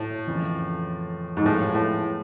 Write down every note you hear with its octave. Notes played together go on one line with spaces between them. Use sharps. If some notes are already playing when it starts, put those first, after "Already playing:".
Already playing: A2 F#3 A#3
F2 C#3 E3
G#2
A2 F3 G#3 B3 E4 G4
A2